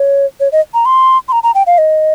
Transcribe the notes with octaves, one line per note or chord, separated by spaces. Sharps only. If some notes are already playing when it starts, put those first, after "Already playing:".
Already playing: C#5
C#5
D#5
A#5
C6
C6
A#5
A#5
G5
F5
D#5